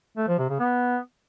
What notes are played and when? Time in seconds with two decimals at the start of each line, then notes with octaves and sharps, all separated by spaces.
0.17 A3
0.28 F3
0.38 C3
0.49 C#3
0.60 B3